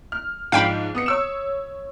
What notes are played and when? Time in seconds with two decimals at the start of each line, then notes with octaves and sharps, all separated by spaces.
0.12 F6
0.52 G#2 F3 D4 F5 G5 B5
0.95 B3 D#6 C#7
1.06 C#5 E6 E7